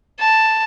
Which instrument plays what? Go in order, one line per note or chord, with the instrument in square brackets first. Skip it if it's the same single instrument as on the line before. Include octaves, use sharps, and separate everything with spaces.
[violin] A5